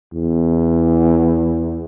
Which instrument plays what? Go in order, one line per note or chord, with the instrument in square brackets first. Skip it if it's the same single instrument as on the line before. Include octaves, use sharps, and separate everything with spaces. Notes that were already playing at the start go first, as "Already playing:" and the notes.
[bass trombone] E2